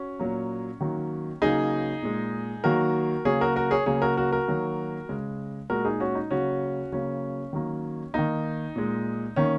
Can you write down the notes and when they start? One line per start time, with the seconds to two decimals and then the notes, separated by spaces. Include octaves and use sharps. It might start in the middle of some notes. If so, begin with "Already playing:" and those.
Already playing: C#4 F#4
0.19 A#2 F#3 A#3
0.81 D#3 F#3 A#3
1.42 C#3 F#3 A#3 D#4 G#4
2.03 A#2 G#3
2.64 D#3 F#3 A#3 F#4 A#4
3.25 C#3 F#3 A#3 G#4 C#5
3.41 F#4 A#4
3.56 F#4 A#4
3.71 G#4 C#5
3.86 C#3 F#3 A#3 G#4 C#5
4.02 F#4 A#4
4.17 F#4 A#4
4.32 F#4 A#4
4.48 D#3 F#3 A#3
5.09 C#3 G#3
5.70 A#2 G#3 F#4 A#4
5.85 D#4 G#4
6.00 C#4 F#4
6.15 D#4
6.30 C#3 F#3 A#3 C#4 F#4
6.92 C#3 F#3 A#3 C#4
7.53 D#3 F#3 A#3
8.14 D#3 A#3 D#4
8.76 A#2 G#3
9.36 D#3 A#3 C#4